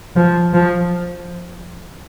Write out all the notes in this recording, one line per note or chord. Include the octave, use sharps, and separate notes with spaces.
F3
F3